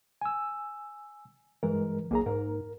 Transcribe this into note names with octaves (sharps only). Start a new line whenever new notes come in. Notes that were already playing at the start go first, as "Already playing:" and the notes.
G#5 E6
G2 E3 G#3 A#4
B1 A#3 G#4 A#5
G#2 A#4